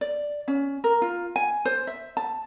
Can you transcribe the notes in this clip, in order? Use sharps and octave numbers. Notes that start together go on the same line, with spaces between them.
D5
C#4
A#4
F4
G#5
C5
E5
A5